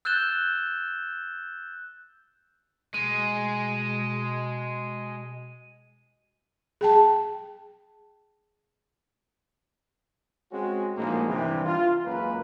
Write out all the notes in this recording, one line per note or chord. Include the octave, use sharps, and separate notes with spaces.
E6 F#6 G6 A6 E7 G7
B2 G#3 D#7
G#4 G5 A5
G#3 C4 C#4 F#4
A#1 A2 G#3 A#3 D#4
G2 C3 E3
F4
C#2 F#2 A#3 B4